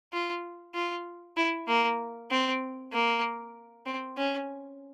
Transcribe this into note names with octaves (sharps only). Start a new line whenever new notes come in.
F4
F4
E4
A#3
C4
A#3
C4
C#4